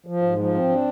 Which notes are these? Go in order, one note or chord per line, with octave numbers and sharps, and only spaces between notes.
F3
G#2
F3
C4
D4